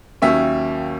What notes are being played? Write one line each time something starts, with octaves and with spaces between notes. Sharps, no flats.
D#2 D#3 F#3 A#3 C#4 E5